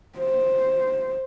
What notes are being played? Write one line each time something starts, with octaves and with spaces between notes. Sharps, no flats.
C5